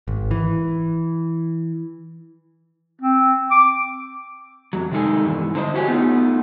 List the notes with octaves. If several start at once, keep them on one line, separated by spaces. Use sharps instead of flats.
G#1
E3
C4
D6
F2 F#3
C3 D#3 G#3 D#4 A4 G#5
E2 G2 E3
D3 C5 D#5
E4 F#4 G4 C#5 G#5
A3 B3 D#4 F4